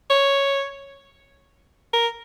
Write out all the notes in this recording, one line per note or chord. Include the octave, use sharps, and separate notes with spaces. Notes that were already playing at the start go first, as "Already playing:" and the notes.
C#5
A#4